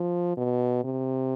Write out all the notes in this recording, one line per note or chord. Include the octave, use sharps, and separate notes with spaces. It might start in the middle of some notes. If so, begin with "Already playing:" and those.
Already playing: F3
B2
C3